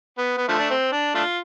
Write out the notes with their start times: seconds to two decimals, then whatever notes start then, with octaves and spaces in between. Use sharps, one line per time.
0.18 B3
0.38 B3
0.48 D3 F3 A3
0.59 D4
0.70 C4
0.92 D4
1.15 A3 D4 F4